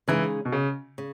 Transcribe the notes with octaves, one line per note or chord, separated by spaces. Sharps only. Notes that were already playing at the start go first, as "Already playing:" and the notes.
C#3 E3 G#3 D#4 G#4
B2
C#3
C#3